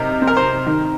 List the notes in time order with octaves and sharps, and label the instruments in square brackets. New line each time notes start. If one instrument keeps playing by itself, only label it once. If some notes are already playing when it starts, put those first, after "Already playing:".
Already playing: [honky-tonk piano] C3 D#4 [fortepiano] A#4
[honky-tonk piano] C4
[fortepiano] A#4
C5
[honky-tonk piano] D#3